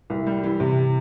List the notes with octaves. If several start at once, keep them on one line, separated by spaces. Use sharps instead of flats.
C2
G3
E3
C3